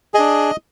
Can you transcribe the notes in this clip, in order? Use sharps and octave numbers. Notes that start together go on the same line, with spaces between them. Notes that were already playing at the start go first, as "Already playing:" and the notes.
D4 G#4 D#5